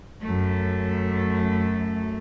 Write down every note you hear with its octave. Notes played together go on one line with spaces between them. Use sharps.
F#2 A3